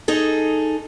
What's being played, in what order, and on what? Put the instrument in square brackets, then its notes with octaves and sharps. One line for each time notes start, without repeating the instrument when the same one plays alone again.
[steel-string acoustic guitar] D#4 G#4 A4